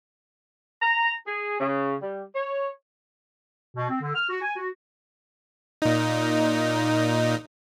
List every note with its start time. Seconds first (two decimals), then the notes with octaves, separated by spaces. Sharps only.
0.82 A#5
1.27 G#4
1.60 C#3
2.02 G3
2.35 C#5
3.75 B2
3.89 C4
4.01 D3
4.14 F6
4.29 F#4
4.42 G#5
4.56 F#4
5.82 A#2 D#4